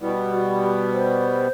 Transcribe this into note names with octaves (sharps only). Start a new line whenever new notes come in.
B2 G3 B3 E4
F#4
G4
C5